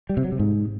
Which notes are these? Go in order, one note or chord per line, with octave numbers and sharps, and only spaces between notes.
G3
C3
F#3
C3
G#2